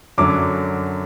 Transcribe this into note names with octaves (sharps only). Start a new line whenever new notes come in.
F#2 D3 F#3 D6